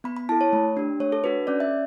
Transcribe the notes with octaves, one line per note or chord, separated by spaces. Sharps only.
B3 B5
B5
E4 A4 A5
C#5
A3
D4 G4
A3 C#5
A4
D4 F#4 A4 B4
C#4 D5
E5